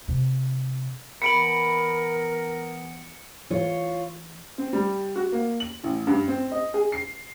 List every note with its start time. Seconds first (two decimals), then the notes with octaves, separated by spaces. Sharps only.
0.08 C3
1.22 E3 B3 A#4 B5 C#7 D7 F#7
3.51 E3 F4 C#5
4.58 C4
4.73 G3
5.16 F#4
5.32 A#3
5.60 F#7
5.84 A1
6.07 G2
6.28 C4
6.51 D#5
6.74 G#4
6.92 C7